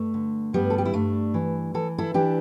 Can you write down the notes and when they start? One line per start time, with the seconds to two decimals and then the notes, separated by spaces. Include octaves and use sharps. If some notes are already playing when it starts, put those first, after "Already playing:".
Already playing: G2 A3
0.14 D3
0.53 G2 G3 B3
0.70 A4
0.78 G4
0.85 E4
0.93 G2 A3 D4
1.34 E3
1.74 E3 A4
1.98 E4 A4
2.14 E3 D4 G4